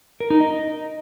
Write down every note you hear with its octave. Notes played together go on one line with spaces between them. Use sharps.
A#4
D#4
D#5